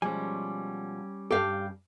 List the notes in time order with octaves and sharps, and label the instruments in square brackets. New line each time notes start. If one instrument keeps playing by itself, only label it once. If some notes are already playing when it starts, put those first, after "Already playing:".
[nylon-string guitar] B2 F3 G#3 [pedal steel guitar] G3 C#4 [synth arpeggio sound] G#5
[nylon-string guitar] G2 A5 [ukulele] G4 F5 [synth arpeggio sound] A4